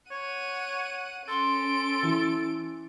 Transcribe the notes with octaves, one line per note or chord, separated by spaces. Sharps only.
C#5 F#5 D#7
C#4 A4 C6 D7
E3